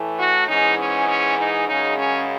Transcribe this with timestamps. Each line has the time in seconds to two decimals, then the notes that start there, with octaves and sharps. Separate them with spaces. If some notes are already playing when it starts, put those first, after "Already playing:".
Already playing: A2 E3 A3
0.18 F#4
0.48 G#2 E3 G#3 C#4 D#4
0.77 C#4
1.07 C#4
1.37 D#4
1.67 F#2 C#3 G#3 C#4 D#4
1.97 C#4